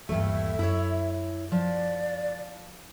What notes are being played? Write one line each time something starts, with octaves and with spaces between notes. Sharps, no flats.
D#1 G2 E3 A3 A#3 E5
F#2 E4 C#5
F3 D5